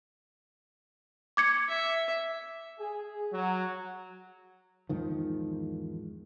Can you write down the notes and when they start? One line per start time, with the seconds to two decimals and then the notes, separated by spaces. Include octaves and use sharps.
1.37 D6 G#6 C#7
1.68 E5
2.78 G#4
3.32 F#3
4.89 E2 G#2 D#3 F3